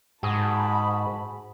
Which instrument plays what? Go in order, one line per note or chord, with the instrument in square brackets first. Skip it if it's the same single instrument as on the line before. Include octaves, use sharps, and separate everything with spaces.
[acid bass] G#2 [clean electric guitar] F#4 G#4 [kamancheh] A5 B5